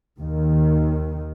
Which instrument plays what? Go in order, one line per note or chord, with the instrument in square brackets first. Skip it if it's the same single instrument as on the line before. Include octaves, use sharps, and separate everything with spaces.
[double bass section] D#2 D#3